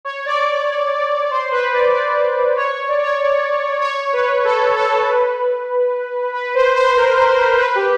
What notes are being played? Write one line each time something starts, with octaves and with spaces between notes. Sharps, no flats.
C#5
D5
C5
B4
D5
D5
C#5
C#5
D5
C#5
D5
C#5
B4
A4
A4
B4
B4
C5
C5
A#4
B4
G4